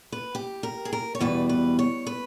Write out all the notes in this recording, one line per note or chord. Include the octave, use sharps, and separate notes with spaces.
B4
G4
A#4
G#4
A#4
C#5
E2 B2 G3 B4
B4
C#5
B4